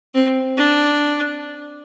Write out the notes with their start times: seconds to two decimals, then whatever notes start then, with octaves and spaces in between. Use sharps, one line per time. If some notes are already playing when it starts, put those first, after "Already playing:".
0.14 C4
0.57 D4